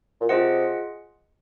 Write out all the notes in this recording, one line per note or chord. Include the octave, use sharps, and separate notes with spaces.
A#2
C3 F4 G#4 D#5 F#5